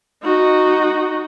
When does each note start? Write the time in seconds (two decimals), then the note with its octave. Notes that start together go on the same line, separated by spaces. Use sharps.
0.23 D#4 F#4